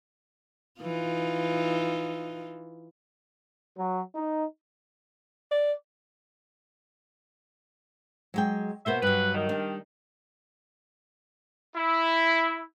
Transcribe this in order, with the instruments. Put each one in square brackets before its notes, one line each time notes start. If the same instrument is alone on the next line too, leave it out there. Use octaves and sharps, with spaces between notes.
[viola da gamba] E3 D#4 F4
[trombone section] F#3
D#4
[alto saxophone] D5
[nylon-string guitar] F#3 G#3 G5
[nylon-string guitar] B2 A#3 B3 [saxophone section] C5 E5
[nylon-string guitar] G2 F#3 [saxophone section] B4
[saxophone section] D#3
[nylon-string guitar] G3 D4
[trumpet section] E4